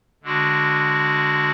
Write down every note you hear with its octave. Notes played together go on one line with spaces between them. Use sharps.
D3 G#3 D4 F#4